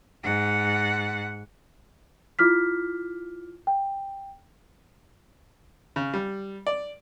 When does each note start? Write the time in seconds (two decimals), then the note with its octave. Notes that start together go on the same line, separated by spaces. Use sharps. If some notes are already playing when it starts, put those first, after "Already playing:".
0.23 G#2 F#5
2.39 E4 F4 D6 F6 B6
3.67 G5
5.96 C#3
6.14 G3
6.67 D5